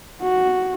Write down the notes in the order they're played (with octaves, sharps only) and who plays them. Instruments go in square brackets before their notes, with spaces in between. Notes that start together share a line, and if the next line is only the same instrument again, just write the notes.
[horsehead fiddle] F#4